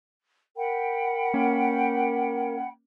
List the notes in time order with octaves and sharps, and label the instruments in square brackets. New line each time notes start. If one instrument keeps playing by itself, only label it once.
[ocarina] A#4 [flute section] F#5 G5 B5
[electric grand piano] A#3 C#4